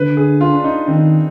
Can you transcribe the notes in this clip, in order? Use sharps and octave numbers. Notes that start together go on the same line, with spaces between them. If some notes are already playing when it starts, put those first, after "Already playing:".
Already playing: D3 B4
G#4
F4
D4
D#4
D#3 C4